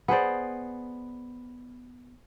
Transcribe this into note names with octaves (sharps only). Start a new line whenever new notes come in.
B3 G#4 C5 D5